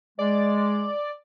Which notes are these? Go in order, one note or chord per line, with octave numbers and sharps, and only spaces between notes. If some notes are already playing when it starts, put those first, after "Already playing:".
G#3 D5